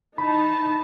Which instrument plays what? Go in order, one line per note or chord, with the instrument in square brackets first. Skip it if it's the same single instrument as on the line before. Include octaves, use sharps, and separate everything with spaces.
[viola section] E3 D#4 A5 [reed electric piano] B5